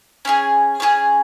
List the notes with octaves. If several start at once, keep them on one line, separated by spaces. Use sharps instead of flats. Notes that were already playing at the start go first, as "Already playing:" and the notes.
C#4 F4 G#4
C#4 F4 G#4